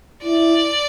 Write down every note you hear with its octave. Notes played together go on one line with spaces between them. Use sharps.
E4 D5